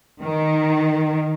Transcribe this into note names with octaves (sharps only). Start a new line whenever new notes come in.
D#3